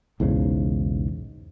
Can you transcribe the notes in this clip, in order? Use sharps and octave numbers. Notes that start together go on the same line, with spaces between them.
B1 E2 G#2 C#3